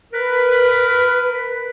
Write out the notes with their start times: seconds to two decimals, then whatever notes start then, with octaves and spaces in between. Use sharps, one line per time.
0.13 A#4 B4